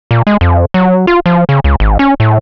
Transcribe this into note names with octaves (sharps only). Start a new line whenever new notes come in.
A#2
G#3
F2
F#3
F4
F3
C#3
C#2
G#1
C#4
A2